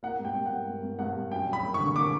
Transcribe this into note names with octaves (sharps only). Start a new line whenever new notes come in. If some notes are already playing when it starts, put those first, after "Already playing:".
A#3 F#5
G2
G5
G2
F#5
G2
G2
G2
G2 F#5
G2
F#2 G5
F#2
B5
A#3
C#6
D3
A#3 D6